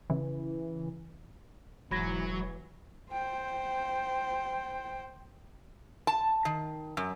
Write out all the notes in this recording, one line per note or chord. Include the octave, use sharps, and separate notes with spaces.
C#3 E3
E1 G#2 E3 F#3 B5 G#6 A#6
C5 G5
A5
D#3
F#2